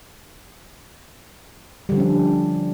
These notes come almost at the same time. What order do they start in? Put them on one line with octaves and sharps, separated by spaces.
G3 D3 F3 C#4 D4